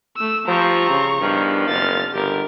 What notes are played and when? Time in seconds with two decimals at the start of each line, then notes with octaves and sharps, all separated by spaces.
0.17 A3 E6
0.48 F3 G3 C4 A#5 C#6
0.89 C#3
1.21 E2 G2 D#3 F3
1.69 F#1 F6 A6
2.14 G1 G4 A#4